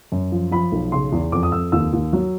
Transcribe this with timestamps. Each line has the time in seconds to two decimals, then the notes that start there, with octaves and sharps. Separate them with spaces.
0.12 F#2
0.32 F3
0.51 F3 B5
0.72 B1
0.92 C#3 C6
1.12 E2
1.32 F2 D6
1.43 D#6
1.52 F2 E6
1.72 D#2 E6
1.93 D#2
2.13 F#3